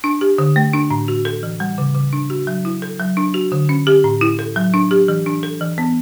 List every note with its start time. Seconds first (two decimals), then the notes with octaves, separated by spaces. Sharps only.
0.04 D4
0.21 G4
0.38 D3
0.56 A3
0.73 D4
0.91 A2
1.08 F#4
1.25 A4
1.43 E3
1.60 G3
1.78 C#3
1.95 C#3
2.13 D4
2.30 F#4
2.47 F#3
2.65 E4
2.82 A4
3.00 F#3
3.17 D4
3.34 F#4
3.52 D3
3.69 C#4
3.87 G4
4.04 A2
4.21 E4
4.39 A4
4.56 F#3
4.74 D4
4.91 G4
5.08 E3
5.26 D4
5.43 A4
5.61 E3
5.78 B3